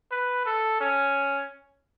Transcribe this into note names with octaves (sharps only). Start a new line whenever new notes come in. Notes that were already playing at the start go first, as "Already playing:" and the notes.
B4
A4
C#4